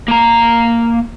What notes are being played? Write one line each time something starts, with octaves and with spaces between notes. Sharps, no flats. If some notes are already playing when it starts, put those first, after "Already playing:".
A#3 A#5